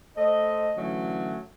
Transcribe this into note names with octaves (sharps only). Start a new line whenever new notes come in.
A3 C5 D#5
D3 E3 F#3 A3 C#4